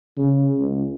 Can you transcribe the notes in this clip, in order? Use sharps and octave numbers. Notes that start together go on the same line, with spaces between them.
C#3
C#2